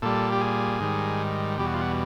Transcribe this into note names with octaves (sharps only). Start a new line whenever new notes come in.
A#2 G3 A4
G4
G#4
G#2 D#3 G3
E2 B2 G3 G4
F#4
F4
F#4